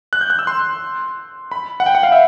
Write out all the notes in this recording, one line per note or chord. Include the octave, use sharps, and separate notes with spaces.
F#6
G6
F#6
E6
C6
B5
F#5
G5
F#5
F5
E5